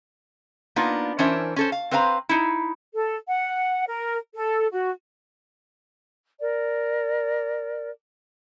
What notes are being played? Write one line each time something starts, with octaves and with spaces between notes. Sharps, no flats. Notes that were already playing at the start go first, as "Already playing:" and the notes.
A#3 B3 D4 D#4 F4
E3 C#4 D4 A#4 C5 E5
C#4 A4 C5
F5
C4 B4 C5 F5 G#5 A#5
D#4 E4
A4
F#5
A#4
A4
F#4
A#4 D5